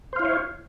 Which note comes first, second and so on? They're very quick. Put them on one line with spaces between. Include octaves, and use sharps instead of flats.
C5 F5 E4 C#5